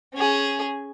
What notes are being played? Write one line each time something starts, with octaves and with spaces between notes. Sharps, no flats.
C#4 G#4